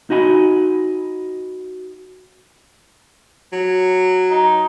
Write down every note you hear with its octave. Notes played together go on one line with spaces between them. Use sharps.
D#4 F#4 D#5 G#5 B5
F#3
D#4